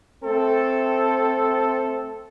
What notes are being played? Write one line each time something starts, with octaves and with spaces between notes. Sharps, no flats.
A3 C4 A4